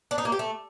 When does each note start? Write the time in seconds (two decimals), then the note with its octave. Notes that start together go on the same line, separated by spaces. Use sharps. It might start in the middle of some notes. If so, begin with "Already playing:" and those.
0.11 D4
0.18 D#4
0.25 A#3
0.32 G4
0.39 A3